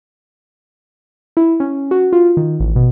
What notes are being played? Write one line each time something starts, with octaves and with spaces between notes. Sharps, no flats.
E4
C#4
F#4
F4
D#3
A1
B2